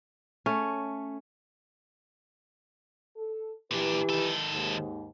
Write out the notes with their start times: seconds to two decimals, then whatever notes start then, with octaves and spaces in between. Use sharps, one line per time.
0.46 A3 C#4
3.16 A4
3.71 A#2 E3 D4 G4 B4
4.10 D#3 A4
4.52 D#2 G#2